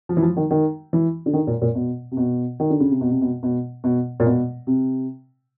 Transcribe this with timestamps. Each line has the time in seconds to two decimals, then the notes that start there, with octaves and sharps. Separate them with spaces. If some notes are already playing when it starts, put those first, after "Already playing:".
0.09 F3
0.17 E3
0.23 F3
0.37 D#3
0.51 D#3
0.93 E3
1.26 D3
1.33 D#3
1.47 A#2
1.62 A#2
1.75 B2
2.11 C3
2.17 B2
2.60 D#3
2.70 D3
2.80 C#3
2.91 C3
3.01 B2
3.11 C3
3.22 B2
3.43 B2
3.84 B2
4.20 A#2
4.26 B2
4.67 C3